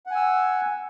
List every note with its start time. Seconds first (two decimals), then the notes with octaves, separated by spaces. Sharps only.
0.06 F#5
0.11 G#5
0.16 E6